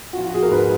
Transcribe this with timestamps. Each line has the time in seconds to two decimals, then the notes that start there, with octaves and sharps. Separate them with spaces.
0.13 F#4
0.17 F3 F4
0.26 F#4
0.34 F3 G#4
0.43 A#4
0.51 G#2 B4